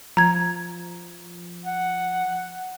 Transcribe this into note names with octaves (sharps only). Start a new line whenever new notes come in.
F3 A#5 G#6
F#5